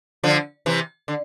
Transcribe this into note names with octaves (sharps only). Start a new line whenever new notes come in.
D3 F3
C3 E3
D3